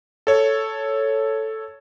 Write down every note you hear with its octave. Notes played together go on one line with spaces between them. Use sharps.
A4 C#5